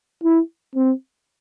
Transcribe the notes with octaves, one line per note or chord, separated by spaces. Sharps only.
E4
C4